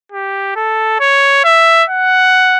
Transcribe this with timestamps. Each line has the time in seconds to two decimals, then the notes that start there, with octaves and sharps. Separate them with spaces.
0.12 G4
0.56 A4
1.00 C#5
1.44 E5
1.89 F#5